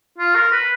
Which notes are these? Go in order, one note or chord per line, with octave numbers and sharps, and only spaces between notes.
F4
A#4
B4